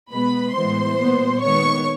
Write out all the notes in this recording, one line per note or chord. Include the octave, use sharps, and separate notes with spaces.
B2 G#3 B3 B4 B5
A2 E3 G#3 B3 C5 C6
A#2 G3 B3
D#3 G#3 B3 C#5 C#6